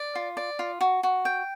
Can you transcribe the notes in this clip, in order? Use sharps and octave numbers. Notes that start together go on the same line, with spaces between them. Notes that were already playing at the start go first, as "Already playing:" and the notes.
Already playing: D5
F4
D5
F4
F#4
F#4
G5